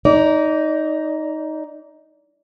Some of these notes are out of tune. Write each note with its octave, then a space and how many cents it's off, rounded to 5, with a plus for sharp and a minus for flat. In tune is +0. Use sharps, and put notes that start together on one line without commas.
D#4 +5 D5 -25